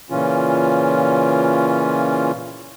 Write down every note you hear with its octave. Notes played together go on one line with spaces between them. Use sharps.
A#2 C#3 E3 C#4 F4